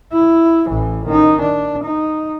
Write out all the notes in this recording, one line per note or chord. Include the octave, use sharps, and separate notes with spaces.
E4
A1 E3
D#3 D#4
D4
D#4